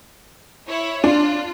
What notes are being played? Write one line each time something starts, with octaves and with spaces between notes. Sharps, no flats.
E4 C#5
D4 F4